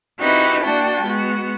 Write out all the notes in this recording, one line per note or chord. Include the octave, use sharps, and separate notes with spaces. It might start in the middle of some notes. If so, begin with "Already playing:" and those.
C4 D#4 E4 F#4 G4 B4
A#3 D4 F#4 G5 A5
G#3 B3 F#4